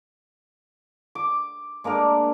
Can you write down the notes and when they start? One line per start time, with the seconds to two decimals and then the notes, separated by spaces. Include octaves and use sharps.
1.15 D6
1.84 G#3 A#3 D4 A#4